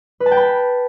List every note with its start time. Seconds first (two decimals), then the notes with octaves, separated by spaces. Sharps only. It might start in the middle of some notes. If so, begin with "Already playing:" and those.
0.20 B4
0.26 A5
0.31 G5
0.37 B5